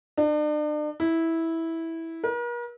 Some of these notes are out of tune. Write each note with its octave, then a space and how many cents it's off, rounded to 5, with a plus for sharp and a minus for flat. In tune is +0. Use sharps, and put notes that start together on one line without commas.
D4 +40
E4 -10
A#4 +45